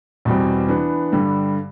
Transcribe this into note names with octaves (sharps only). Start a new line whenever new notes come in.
E2 B2 G3 C4
E3 B3 D4
G2 D3 G3